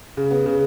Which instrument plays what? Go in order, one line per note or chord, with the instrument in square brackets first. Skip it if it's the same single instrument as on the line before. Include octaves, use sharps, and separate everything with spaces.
[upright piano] C#3
B3
C#3